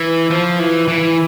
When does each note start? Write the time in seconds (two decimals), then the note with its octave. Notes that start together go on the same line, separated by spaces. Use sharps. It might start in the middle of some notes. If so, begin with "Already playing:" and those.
Already playing: E3
0.30 F3
0.59 E3
0.88 E3